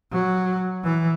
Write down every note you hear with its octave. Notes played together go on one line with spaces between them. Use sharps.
F#3
E3